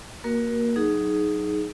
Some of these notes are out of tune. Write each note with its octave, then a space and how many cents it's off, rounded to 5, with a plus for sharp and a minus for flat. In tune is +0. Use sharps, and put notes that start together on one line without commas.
A#3 +0 F#4 +0 A#4 +25
F#3 +0 D#4 +0 G#4 +15